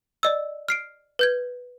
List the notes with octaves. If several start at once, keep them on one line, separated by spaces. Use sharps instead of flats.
D5 D#5 E6
F6 C7 D7
B4 G6 G#6